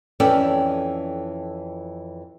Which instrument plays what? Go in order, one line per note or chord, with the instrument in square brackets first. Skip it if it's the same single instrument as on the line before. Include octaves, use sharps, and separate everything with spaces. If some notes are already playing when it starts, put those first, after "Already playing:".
[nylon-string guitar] F2 E3 C#4 A4 D5 G5